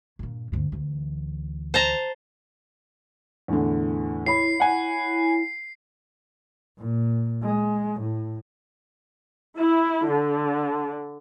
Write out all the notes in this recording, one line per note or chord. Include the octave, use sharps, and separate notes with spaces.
G2 A#2
D2 G2
D2 E3
C5 A5 A#5
E2 A2 D3
E4 C#5 B5 C7
F#5 G#5
A#2
G#3
A2
E4
D3